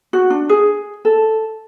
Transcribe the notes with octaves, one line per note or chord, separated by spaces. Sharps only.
F#4
D4
G#4
A4